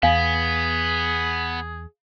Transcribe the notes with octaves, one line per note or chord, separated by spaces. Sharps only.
E2 B3 G#4 F5 G#5